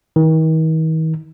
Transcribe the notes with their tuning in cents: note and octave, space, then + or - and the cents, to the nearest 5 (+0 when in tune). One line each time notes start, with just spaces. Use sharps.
D#3 +45